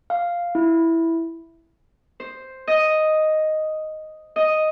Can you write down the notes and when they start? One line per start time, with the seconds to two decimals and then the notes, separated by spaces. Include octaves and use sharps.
0.10 F5
0.55 E4
2.20 C5
2.67 D#5
4.36 D#5